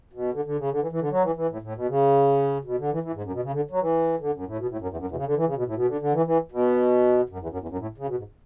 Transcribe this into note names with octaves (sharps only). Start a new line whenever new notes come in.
B2
D3
D3
C#3
D3
E3
E3
D3
F#3
E3
E3
A2
A2
B2
C#3
B2
D3
E3
E3
G#2
F#2
B2
C#3
D3
F#3
E3
D3
F#2
A2
B2
A2
F#2
E2
F#2
E2
B2
C#3
D3
E3
C#3
B2
A2
B2
D3
D3
E3
E3
B2
F#2
E2
F#2
E2
F#2
A2
C#3
B2
G#2